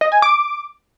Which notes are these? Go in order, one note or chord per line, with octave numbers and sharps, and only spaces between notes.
D#5
G#5
D6